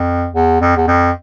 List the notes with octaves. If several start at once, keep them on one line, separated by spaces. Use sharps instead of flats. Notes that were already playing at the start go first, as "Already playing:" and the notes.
Already playing: F2
E2
F2
E2
F2